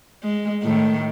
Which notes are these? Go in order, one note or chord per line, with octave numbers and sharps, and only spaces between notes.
G#3
A2 D#3